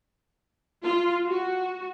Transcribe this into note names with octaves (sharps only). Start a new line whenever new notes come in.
F4
F#4